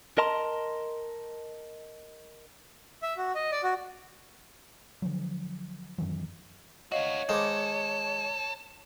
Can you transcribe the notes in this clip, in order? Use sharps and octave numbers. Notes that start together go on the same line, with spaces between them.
A#4 D#5 A5 A#5 C6
E5
F#4
D#5
D5
F#4
D3 F3 F#3
F#2 D#3 E3 F#3
D4 F#4 C#5 D#5 F5
D#3 G#3 A4 C5 D6